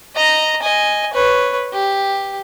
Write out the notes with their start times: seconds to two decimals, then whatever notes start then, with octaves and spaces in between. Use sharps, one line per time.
0.16 D#5 A#5
0.62 D#5 G#5
1.13 B4 C#5
1.73 G4